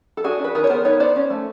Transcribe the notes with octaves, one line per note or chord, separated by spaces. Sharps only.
A4
D4 F#4 G#4
D4
B4
D#3 G#4 A#4
C#5
B3 A#4 C5
D#4 B4 C#5
B3 C5 D5
C#4
A3